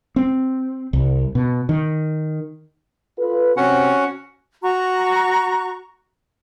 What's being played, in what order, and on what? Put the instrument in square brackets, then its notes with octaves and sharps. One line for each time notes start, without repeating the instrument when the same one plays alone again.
[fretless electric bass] C4
C2
B2
D#3
[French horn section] F4 A4 B4
[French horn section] C3 C4 [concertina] C#4 F#4 F#5
[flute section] F#4 A#5 C#6